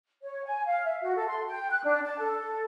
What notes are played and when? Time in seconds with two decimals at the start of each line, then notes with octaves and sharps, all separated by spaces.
0.22 C#5
0.46 G#5
0.66 F5
0.84 E5
1.02 F#4
1.16 A4
1.28 C6
1.48 G5
1.71 F#6
1.84 D4
2.05 A5
2.19 A4